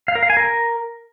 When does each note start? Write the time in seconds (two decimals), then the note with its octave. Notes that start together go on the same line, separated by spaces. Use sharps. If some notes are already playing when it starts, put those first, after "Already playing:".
0.08 F5
0.15 A#4
0.23 F5
0.30 G#5
0.37 A#4